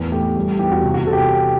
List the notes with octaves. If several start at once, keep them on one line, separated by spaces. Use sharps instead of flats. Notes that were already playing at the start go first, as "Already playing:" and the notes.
Already playing: E2 A2
A3 G4
G3 G4
E2 G4
F#4
C3 G4
F#4
C3 A4
G4